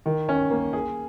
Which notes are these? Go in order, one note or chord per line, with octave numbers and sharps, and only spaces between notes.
D#3
C#4
A#3
G#4